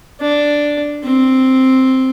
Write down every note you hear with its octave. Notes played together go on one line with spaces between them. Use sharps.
D4
C4